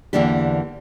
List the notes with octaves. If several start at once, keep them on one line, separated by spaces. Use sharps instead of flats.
E2 D3 E3 A#3 D4 G4